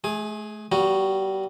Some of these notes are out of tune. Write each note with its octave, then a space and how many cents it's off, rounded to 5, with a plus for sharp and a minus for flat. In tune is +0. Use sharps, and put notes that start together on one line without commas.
A3 -40 G#4 +0
G3 -30 B3 -25 F#4 +0